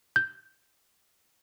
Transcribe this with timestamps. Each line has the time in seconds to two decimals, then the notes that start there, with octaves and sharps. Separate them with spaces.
0.16 G6